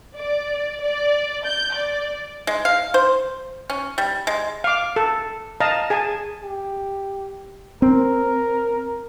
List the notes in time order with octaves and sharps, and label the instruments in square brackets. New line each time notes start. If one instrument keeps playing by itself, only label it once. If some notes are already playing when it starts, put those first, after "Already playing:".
[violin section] D5
D5
G6
D5
[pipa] G#3
F5
C5
C#4
G3
G#3
[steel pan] F5 D6
A4
D#5 F5 A5 A#5
G#4 G#5 A5
[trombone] G4
[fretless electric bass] C4 [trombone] A#4